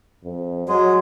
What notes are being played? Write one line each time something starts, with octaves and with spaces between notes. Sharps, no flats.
F2
F#3 G#3